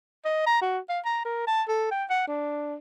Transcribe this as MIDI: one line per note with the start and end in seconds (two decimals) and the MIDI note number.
0.25 0.42 75
0.46 0.60 82
0.62 0.79 66
0.89 1.00 77
1.05 1.20 82
1.25 1.45 70
1.47 1.63 81
1.68 1.88 69
1.91 2.05 79
2.10 2.23 78
2.28 2.75 62